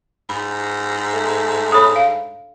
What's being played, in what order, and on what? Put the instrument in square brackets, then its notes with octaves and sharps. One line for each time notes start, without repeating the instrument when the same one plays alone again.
[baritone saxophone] G#2 [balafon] B5
[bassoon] A3
[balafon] A4 C#5 [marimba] B5 D#6
[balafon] F5